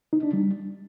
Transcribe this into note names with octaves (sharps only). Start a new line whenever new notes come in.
D#4
D4
G3